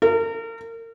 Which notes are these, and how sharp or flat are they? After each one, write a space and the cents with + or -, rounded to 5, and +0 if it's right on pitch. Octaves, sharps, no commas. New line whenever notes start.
A#4 -35